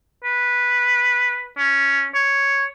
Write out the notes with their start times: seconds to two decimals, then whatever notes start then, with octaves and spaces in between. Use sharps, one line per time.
0.24 B4
1.58 C#4
2.15 C#5